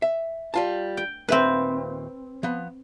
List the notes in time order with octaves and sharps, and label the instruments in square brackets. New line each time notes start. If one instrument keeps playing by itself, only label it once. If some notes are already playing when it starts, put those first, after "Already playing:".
[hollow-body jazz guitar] E5
G3 F4 A5
[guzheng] G5
[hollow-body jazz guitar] D#2 A#2 E5 [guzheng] C4 B4
[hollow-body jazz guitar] F3 B3